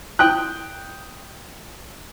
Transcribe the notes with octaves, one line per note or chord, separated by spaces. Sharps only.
G5 D#6 F#6